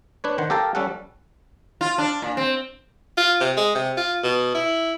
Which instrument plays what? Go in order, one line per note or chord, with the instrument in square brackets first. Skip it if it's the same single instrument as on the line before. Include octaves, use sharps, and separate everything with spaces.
[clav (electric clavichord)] D4 B4 C#5
D#3 C5 F#5
G4 A4 A#4 F5 G5 A5
G3 C#4 A4 F#5
[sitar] F4
D4
A#2
C4
[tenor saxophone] F4
C3
G#3
C3
F4
B2
E4